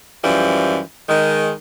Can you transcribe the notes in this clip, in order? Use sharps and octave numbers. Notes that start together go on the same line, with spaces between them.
F#2 E3 F3 G3
D#3 G#3